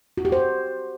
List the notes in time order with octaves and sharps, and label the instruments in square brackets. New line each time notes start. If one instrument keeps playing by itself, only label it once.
[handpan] F#4
G4
C5